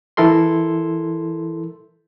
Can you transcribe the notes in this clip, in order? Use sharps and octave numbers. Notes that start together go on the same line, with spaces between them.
E3 E4 A4 A#4 C6